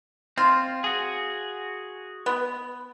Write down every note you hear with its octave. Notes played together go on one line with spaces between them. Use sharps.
C4 F4
F#4 G#4
B3